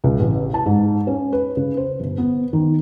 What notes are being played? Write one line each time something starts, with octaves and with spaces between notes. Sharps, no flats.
C#2
A1
A5
G#2
C#4
B4
C#3
C5
G1
B3
D#3